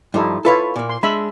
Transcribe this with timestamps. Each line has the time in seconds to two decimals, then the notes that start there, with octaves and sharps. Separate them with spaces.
0.14 G2 F3 D#4 E4 A4
0.45 E4 F4 A4 B4 C#5
0.76 A#2 A#3
0.89 C6
1.03 G#3 D4 E5 B5